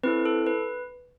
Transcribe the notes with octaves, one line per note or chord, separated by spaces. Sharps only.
C4 E4 A4 B4
A4
B4